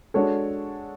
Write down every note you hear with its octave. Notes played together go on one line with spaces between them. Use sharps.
G#3 D4 F#4 A4 C#5